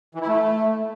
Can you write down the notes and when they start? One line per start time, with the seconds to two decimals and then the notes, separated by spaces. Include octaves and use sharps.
0.15 E3
0.21 E4
0.28 A3